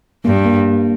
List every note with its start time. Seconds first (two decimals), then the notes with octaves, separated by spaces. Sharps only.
0.25 G2 A#3
0.45 A#3